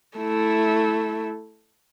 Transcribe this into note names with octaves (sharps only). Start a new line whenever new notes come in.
A3 E4